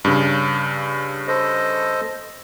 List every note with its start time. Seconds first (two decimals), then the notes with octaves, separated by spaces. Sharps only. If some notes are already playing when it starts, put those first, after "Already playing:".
0.05 G2 C#3
1.27 A4 C5 D#5